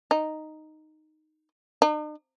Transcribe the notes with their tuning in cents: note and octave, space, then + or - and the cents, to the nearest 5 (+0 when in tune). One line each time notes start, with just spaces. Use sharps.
D#4 -5
D#4 -45